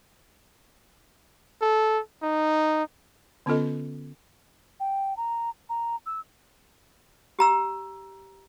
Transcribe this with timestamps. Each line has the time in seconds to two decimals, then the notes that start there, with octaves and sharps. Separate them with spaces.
1.61 A4
2.23 D#4
3.46 D3 B3 C#4 F4 A4 D#5
4.80 G5
5.17 A#5
5.69 A#5
6.06 E6
7.39 G4 A#5 E6